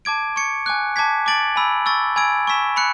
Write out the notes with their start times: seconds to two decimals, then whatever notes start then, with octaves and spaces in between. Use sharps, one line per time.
0.05 A5 D6 G#6 D7
0.36 C#6 G#6 C#7
0.66 G#5 D6 F#6
0.96 A5 D6 G#6 B6
1.26 A5 D6 A6 D7 F#7
1.56 G#5 B5 E6
1.86 C#6 E6 A6
2.16 G#5 B5 E6 G#6 D7
2.47 G#5 C#6 E6 B6 E7
2.76 B5 F#6 C#7